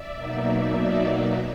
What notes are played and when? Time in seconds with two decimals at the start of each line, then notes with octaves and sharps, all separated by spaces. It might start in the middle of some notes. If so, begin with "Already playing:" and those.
Already playing: D5 E5
0.16 B2 F#3 A#3 D#4
0.78 D5 E5